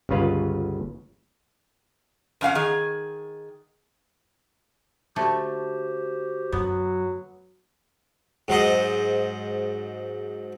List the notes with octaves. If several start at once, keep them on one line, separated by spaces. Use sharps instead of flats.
G1 C#2 C#3 F4 B4 F5
F2 C#4 F5 F#5
D#3 G#4
D3 A3 F#4 G4 C5
F#2 F#3 B3
G#2 F#3 C5 D#5